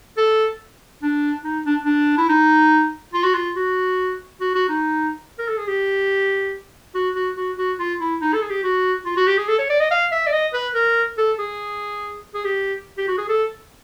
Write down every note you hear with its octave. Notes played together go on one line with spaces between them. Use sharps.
A4
D4
D#4
D4
D4
E4
D#4
F4
F#4
F4
F#4
F#4
F#4
D#4
A#4
A4
G#4
G4
F#4
F#4
F#4
F#4
F4
E4
D#4
A4
G#4
G4
F#4
F4
F#4
G4
G#4
A4
C#5
D5
D#5
F5
E5
D5
D#5
B4
A#4
A4
G#4
G#4
G4
G4
F#4
G#4
A4